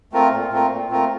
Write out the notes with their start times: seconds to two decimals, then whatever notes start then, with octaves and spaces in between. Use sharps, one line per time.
0.12 A3 C4 F4 A#4
0.32 A#2
0.51 A3 C4 F4 A#4
0.70 A#2
0.89 A3 C4 F4 A#4